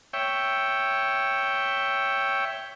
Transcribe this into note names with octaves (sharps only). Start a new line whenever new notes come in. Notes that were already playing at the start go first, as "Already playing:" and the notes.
C#5 E5 G5